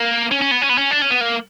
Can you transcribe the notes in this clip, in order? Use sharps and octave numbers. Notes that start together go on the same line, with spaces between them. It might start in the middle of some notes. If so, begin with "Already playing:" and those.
Already playing: A#3
C#4
C#4
B3
C#4
B3
C#4
D4
C#4
B3
A#3